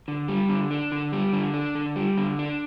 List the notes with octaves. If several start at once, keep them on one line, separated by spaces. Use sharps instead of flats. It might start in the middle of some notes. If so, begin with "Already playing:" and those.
D3
G3
D3
D4
D3
G3
D3
D4
D3
G3
D3
D4